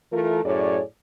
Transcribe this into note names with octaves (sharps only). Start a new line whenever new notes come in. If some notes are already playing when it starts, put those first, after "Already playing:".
E3 A3 F4 A4 A#4
F#2 A2 G#4 C#5 D5